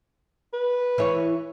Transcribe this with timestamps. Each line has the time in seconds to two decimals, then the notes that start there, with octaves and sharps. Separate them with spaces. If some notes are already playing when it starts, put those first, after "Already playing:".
0.53 B4
0.98 E3 E4 C#5